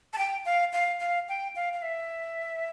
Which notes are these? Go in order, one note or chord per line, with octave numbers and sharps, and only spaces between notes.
A5
G5
F5
F5
F5
G5
F5
F5
E5